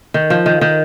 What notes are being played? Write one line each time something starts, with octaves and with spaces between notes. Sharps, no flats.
D#3
F3
D#3
D#3